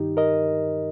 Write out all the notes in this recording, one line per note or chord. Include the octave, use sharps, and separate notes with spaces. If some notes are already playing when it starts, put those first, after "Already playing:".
Already playing: G2 D#3 D#4 G4
A#4 D#5